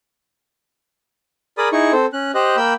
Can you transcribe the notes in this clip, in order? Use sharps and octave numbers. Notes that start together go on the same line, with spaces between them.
G#4 A#4 D5 B5 D#6
D#4 E4 G#4 C#6
C4 A4 C5
C#4 F#6
G4 C5 D#5 F#6
A#3 G5 B5 E6 G6